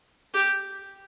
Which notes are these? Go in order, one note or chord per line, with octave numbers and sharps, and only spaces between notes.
G4